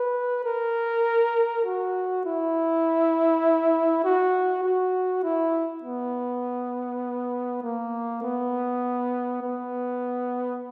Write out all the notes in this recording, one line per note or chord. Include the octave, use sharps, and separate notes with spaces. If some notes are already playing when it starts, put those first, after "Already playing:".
Already playing: B4
A#4
F#4
E4
F#4
F#4
E4
B3
A#3
B3
B3